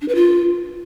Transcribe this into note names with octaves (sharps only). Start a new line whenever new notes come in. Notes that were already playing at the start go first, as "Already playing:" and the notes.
D4
B4
F4